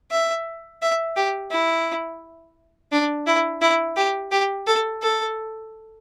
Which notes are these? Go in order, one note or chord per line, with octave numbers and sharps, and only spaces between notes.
E5
E5
G4
E4
D4
E4
E4
G4
G4
A4
A4